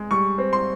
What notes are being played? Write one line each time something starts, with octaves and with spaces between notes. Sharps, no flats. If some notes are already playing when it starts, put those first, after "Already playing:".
Already playing: G#3
G3 C#6
C4
C6